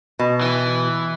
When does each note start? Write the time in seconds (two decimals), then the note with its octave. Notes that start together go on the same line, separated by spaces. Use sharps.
0.19 B2
0.41 E3